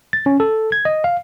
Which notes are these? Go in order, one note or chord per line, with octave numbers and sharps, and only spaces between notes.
A6
C#4
A4
G#6
D#5
F5